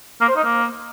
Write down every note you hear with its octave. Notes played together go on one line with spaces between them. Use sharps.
A#3
C5
D#4
A#3